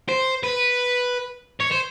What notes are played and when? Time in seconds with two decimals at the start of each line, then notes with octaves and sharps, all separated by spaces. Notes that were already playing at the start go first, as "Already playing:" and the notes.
0.09 C5
0.44 B4
1.61 C#5
1.72 C5